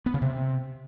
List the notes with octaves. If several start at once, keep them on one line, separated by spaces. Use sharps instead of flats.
B3
C#3
C3